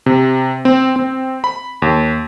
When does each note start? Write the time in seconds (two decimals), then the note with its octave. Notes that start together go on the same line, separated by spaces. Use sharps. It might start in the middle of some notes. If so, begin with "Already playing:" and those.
0.06 C3
0.65 C4
0.96 C4
1.44 B5
1.82 D#2